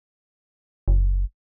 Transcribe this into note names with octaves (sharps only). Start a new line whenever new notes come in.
F#1